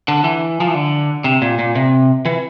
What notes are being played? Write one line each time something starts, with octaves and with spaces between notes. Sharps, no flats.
D3
E3
F3
E3
D3
C3
A#2
A#2
C3
E3